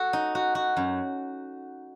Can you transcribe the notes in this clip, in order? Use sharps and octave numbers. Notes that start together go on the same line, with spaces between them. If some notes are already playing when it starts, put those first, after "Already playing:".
Already playing: F#4 A4
D#4
F#4
F#4
F#2